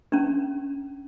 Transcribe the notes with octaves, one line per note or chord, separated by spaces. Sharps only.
C#4 D4